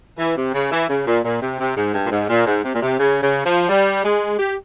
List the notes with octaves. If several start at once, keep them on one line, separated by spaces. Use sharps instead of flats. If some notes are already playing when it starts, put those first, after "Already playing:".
E3
C3
C#3
E3
C#3
A#2
A#2
C3
C3
G#2
G2
A#2
G#2
A#2
G#2
C3
A#2
C3
C#3
C#3
F3
G3
G#3
G4